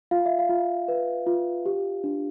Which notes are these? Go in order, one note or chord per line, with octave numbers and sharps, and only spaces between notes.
F4 F5
E5
F5
F4
B4
F4
G4
D4